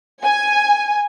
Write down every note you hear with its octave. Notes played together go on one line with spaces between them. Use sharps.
G#5